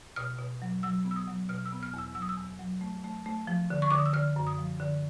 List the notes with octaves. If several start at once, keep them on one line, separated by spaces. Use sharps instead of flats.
B2 F6
B2
F#3
F#3 E6
B3
E6
D#6
F#3
B2 F6
E6
B3
F6
E2 E6
F#3 E6
D#6
E6
E2
F#3
A3
A3
A3
F3
D3
C#6
D3 D6
D#6
E6
D3 F6
F#2
D#6
F3
D3